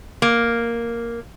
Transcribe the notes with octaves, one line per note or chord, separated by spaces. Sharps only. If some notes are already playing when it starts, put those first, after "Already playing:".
A#3